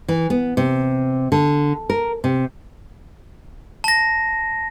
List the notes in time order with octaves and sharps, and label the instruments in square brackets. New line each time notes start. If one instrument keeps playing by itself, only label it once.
[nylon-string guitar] E3
B3
C3
D3
A#4
C3
[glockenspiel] A5 A#6